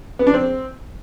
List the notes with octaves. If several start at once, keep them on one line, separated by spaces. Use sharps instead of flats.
B3
D4
C4